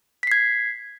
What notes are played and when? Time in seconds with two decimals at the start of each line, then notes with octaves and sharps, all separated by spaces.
0.23 B6
0.27 C7
0.32 G#6